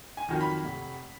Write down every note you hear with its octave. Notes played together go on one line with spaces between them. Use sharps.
G#5
F2 D#3 F#3
B5
F1